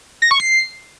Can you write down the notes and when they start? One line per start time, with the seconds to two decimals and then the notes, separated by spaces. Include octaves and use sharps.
0.22 A#6
0.31 C#6
0.40 C7